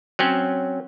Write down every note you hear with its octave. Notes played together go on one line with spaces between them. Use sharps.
F#3 C4 C#4